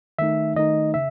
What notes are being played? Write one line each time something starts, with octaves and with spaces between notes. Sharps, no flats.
D#3 A3 D#4 E5
D#3 A3 D#4 D#5
C#3 E5